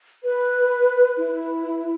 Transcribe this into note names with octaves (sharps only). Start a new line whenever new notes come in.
B4
E4